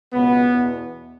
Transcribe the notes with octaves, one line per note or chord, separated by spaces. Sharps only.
C#2 B2 B3
E2 B2